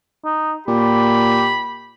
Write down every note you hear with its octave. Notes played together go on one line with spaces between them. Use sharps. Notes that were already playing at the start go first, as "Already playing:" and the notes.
D#4
A#2 G4 B5